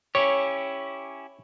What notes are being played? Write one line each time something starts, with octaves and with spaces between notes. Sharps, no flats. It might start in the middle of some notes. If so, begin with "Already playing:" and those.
C#4 E4 G4 C#5